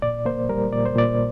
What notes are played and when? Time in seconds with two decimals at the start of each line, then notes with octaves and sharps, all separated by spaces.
0.02 A#2 D5
0.26 A#3 C5
0.49 G3 A#4
0.72 A#2 D5
0.85 C5
0.96 A#2 D5